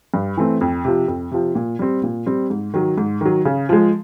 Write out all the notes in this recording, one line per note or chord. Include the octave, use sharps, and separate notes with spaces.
G2
E3 A3 C4
F2
C3 F3
F2
C3 F3
A#2
G3 C4
A#2
G3 C4
G#2
D#3 F#3
G#2
D#3 F#3
C#3
F3 G#3